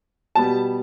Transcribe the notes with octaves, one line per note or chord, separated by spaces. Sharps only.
B2 G3 B3 A5